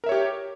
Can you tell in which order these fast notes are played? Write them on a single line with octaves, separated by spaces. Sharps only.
A#4 E5 C#5 G4